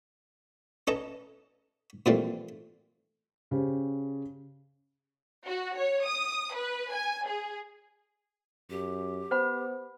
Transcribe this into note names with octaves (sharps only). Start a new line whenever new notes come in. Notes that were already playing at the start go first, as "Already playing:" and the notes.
C#4 A4 B4 D#5 A5 A#5
A#2 E3 F3 G3 A3 C4
C#3 G4 C5
F#4
C#5
D#6
B4
G#5
G#4
F#2 G4
B3 C5 F#5 B5